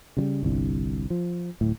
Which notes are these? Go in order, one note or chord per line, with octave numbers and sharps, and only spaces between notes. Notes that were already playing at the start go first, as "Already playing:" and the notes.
C#3 F#3 G3
G1 C2 G2
F3
D1 A2